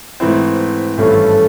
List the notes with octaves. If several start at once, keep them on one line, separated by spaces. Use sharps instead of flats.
G#2 E3 A3 C4 E4
G#1 G2 E3 A3 C#4 A4